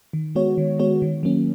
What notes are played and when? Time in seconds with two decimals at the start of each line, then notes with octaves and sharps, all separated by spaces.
0.13 D#3
0.35 G#3 B3 F#4 C#5
0.58 D#3
0.79 G#3 B3 F#4 C#5
1.02 D#3
1.23 F#3 A#3 C#4